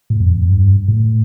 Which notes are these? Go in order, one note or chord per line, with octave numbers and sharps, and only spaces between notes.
A2
F2
E2
F2
G2
A2